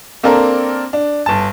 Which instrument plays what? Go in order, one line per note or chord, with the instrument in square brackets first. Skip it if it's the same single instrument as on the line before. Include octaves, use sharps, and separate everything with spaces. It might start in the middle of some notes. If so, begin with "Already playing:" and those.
[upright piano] A#3 C4 D4 A4 A#4
D4
G1 A5